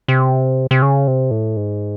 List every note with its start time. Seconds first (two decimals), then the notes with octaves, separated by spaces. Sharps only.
0.08 C3
0.71 C3
0.82 C#3
1.07 C3
1.31 A2
1.57 G#2